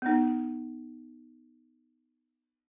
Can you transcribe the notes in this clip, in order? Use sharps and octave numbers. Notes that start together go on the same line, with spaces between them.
B3 D#4